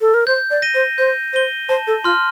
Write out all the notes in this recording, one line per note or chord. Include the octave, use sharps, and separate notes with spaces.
A4
A#4
C5 G6
D5
A#6 D#7 G7
C5
C5 G6
C5 A#6 D#7 G7
C5 A5
A4
F4 C6 F6